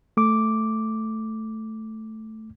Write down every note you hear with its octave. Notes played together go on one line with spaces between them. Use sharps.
A3 D6